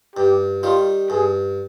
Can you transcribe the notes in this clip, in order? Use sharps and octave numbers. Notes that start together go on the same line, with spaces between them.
G2 G4
D#3 G3 F4
G2 G#4